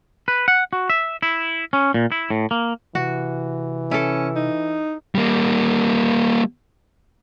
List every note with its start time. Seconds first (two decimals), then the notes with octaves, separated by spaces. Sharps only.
0.28 B4
0.48 F#5
0.73 F#4
0.90 E5
1.23 E4
1.73 C#4
1.94 A#2
2.12 E4
2.30 A2
2.51 A#3
2.95 C3 E3 F#4
3.91 C#4 E4 A4
4.36 D#4
5.15 G3 A#3